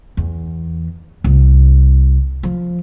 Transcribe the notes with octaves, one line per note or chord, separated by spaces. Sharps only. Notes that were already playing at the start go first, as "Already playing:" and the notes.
E2
C2
F3